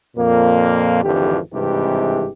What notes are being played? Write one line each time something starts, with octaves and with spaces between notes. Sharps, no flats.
F2 A#2 A#3
G#1 F2 D3 E3 G4
G#1 G2 C3 E3 G#3 G4